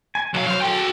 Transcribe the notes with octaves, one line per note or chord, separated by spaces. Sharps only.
G#5
B1 F#3 F5
F#3 C5 F5
F#4 A4 G5